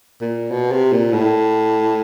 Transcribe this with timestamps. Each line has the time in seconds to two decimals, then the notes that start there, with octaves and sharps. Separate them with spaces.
0.21 A#2
0.51 B2
0.72 C3
0.92 A#2
1.13 A2